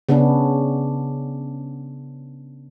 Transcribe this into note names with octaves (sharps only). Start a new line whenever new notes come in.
C#3 B3 C#4 D4